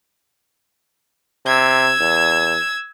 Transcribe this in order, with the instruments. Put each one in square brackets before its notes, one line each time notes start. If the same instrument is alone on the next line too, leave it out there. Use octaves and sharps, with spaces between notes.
[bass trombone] C3 [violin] E6 G#6
[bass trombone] E2